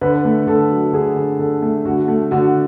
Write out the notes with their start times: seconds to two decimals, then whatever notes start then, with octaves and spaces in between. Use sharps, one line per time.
0.01 D3 B4
0.25 A3
0.47 D3 A4
0.70 F#3
0.93 D3 G#4
1.16 D3
1.39 D3 A4
1.62 A3
1.85 D3 F#4
2.08 A3
2.31 D3 F#4